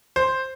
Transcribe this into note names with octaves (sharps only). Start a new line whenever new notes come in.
C5